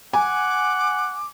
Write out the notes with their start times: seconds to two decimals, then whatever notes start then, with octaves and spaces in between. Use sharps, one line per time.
0.13 F#5 G#5 D6